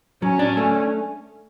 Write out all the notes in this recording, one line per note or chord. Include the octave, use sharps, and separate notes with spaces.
F#3 C#4
D4
A3